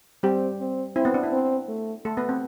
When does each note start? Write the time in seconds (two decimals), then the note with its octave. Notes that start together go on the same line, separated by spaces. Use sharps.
0.23 G3 C4 G4
0.60 C4
0.96 C4 E4
1.05 B3
1.14 D4
1.23 E4
1.32 C4
1.68 A3
2.05 A3 A4
2.17 B3 B4
2.29 C4